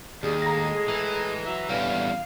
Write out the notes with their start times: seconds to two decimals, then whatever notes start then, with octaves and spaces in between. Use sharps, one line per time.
0.23 D#2 D#3 G3 G#3 G#4
0.42 A2 G#3 A#5 A#6
0.88 E3
1.45 F#3 E5
1.69 E2 D3 E3 G3 C#4 F5